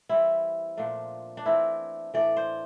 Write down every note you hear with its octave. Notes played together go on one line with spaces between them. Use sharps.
E3 G3 C4 E4
A#2 F3 A3 D4
D4
E3 A3 C4 E4
A2 E3 A3 D5
C5